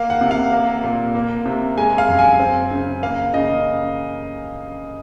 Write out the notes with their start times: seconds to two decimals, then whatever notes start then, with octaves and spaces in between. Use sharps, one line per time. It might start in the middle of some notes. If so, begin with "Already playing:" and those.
Already playing: A#3 F5
0.10 F#5
0.21 C3
0.31 F5
0.52 A#3
0.84 A#2
1.15 A#3
1.46 C3
1.78 G#3 G#5
1.98 F5
2.09 F#2
2.19 G#5
2.40 C4
2.71 C#3
3.03 A#3 F5
3.34 C#3 D#5